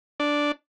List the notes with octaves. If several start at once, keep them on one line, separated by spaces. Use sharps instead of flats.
D4